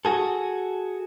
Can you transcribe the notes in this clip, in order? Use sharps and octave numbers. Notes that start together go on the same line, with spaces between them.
F#4 G#4 A4